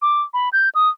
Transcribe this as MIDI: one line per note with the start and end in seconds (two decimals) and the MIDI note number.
0.02 0.22 86
0.34 0.49 83
0.53 0.69 91
0.75 0.89 87